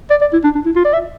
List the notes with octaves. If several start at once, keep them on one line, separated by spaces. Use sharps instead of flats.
D5
D5
E4
D4
D4
E4
F4
D5
E5